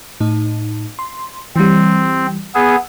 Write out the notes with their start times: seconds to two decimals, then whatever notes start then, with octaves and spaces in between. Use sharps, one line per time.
0.20 A2 D#4
0.99 C6
1.56 E3 G3 C4
2.55 B3 G#4 E6